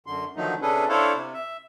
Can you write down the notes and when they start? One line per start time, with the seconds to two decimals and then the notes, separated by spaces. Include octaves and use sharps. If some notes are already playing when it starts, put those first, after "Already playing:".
0.07 F#2 D3 C6
0.36 D3 D#3 F3 F#3 A3 D#4
0.62 C3 C#4 D4 G#4 A4 B4
0.89 D4 E4 A4 C5 C#5 F5
1.16 C3
1.34 E5